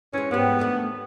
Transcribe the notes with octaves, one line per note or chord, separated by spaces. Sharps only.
E3 G#3 C#4
G#2 G3 B3
D#3 A3 D4